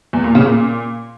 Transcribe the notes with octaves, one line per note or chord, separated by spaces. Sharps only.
E2
A#2
C#3
A#2